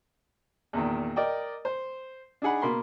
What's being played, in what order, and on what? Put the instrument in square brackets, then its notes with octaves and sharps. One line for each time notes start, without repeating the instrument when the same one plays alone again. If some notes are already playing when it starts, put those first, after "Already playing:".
[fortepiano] E2 A#2 D#3
A#4 D5 D#5 G5
C5
D4 D#4 G#4 F#5 B5
B2 A#3 B5 C6